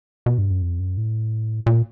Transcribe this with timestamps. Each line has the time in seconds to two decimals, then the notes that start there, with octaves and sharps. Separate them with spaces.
0.26 B2
0.38 G2
0.51 F#2
0.62 F2
0.80 F#2
0.97 A2
1.66 A#2